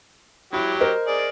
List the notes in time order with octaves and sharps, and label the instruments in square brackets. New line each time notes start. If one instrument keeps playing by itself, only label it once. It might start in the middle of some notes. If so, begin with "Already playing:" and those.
[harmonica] F#3 G4 [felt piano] E4 E5
[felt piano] A#4 C5 D#5
[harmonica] G#4 D5